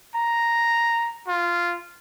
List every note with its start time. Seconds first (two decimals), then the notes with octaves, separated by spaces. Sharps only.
0.15 A#5
1.28 F4